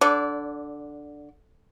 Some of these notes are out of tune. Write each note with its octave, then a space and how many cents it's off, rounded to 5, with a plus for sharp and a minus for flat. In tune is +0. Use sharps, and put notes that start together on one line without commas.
D3 +0 D5 -25